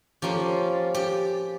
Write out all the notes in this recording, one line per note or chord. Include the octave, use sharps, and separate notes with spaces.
F3 A#3 C#4 F4 G4
G4